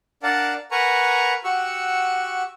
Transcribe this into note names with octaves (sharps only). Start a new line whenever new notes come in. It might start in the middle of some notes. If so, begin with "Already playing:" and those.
D4 A#4 D5 F5 F#5 A5
A#4 B4 F#5 G#5 A#5 C#6
F#4 G4 F#5 C#6 E6